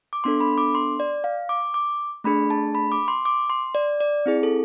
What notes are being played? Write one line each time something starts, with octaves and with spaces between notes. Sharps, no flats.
D6
B3 D4 A4 C6
B5
D6
C6
D5
F5
D6
D6
A3 D4 G#4 B5
A5
B5
D6
C6
D6
C6
D5
D5
C4 E4 G#4
A4